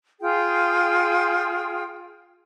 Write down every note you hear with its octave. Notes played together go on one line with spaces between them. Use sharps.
F4 G#4 G5